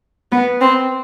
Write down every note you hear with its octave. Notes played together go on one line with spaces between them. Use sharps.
B3
C4